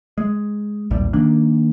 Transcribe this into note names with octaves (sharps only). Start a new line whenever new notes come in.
G#3
A#1 D#2 A2 G3
D#3 A#3 D4